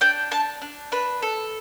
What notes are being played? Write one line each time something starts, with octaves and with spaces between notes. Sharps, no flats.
D4 G5
D4 A5
D4
D4 B4
A4